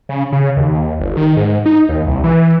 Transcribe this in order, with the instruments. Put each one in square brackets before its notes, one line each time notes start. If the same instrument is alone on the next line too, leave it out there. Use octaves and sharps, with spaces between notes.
[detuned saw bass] C#3
C#3
D#2
G1
D#3
G#2
D#4
D#2
C2
E3